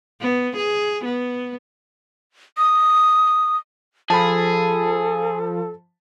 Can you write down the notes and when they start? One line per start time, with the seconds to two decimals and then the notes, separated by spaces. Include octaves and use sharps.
0.21 B3
0.57 G#4
1.05 B3
2.58 D#6
4.10 F3 G#4 A4 A5 B5